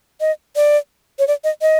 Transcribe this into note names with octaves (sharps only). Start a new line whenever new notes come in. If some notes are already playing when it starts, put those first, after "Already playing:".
D#5
D5
C#5
D5
D#5
D#5